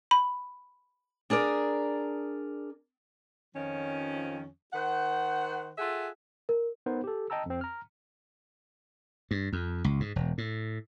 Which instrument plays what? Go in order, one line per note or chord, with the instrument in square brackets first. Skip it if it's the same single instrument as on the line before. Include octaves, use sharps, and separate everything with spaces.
[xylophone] B5
[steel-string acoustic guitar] D4 G#4 A#4 D5
[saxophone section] F2 D#3 F3 C#4
D#3 C5 F#5
F4 G#4 A4 E5 F#5
[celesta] A#4
[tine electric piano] B3 D#4 A#4 C5
G4 A4
D#5 G5 A5 A#5 E6
F2 C4
A#5 F6
[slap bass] G2
F2
C#2
G#2
E1
A2